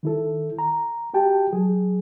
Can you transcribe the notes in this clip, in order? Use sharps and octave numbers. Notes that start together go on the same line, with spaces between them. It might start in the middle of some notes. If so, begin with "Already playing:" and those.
D#3 E4 A4
A#5
F#4 G4 G5 A5
F#3 G#4